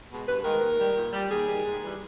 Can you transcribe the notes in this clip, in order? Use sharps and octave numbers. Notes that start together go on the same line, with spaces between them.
B2 G#3
G2 B4
D#3 G#3 A#4
D#2
D#3 G3
A#2
G3
D#2 G#4
D#3 G3
G#2
E3 G3